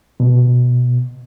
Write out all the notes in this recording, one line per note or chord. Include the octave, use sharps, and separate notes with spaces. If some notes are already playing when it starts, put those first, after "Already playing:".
B2